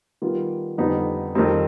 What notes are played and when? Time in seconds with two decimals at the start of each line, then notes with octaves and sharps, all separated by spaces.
0.22 D#3 G3 B3 F4
0.78 F2 D3 G3 B3 D#4
1.35 F2 D#3 G3 C4 D#4